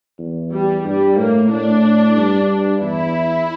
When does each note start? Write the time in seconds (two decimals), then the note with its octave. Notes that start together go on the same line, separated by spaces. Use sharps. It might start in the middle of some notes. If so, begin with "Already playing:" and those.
0.19 E2
0.52 G3
0.84 G2 G3
1.17 A2 A#3
1.51 A2 D4
2.16 G2
2.81 E2 E4